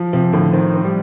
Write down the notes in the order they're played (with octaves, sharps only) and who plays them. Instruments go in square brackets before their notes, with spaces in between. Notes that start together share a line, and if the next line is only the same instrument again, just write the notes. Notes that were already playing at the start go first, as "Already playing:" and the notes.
Already playing: [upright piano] F3
[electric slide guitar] C3 [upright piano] F3
[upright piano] A2 [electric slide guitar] D3
[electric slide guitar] D#3 [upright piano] C4
[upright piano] C4
[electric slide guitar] G3